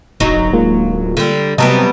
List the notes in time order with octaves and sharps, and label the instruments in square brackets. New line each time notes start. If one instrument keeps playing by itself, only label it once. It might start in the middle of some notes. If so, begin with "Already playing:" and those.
[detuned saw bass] D1 [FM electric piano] G1 A#5 [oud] F#3 D#4
[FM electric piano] G#3 A#3 F4
[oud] D3 G3
[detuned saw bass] C3 [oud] F#3 G3 B3 [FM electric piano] D#5 A5 A#5